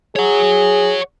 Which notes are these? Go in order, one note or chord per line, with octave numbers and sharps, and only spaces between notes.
G#4 C#5 F#5